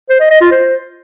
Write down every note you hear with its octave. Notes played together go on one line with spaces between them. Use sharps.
C5
D#5
D#5
F4
C5